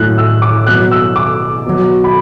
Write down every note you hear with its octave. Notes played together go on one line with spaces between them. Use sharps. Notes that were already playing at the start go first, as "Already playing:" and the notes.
Already playing: A2 F#3 F#6
E6
D6
B2 F#3 F#6
E6
D6
B2 F#3
B5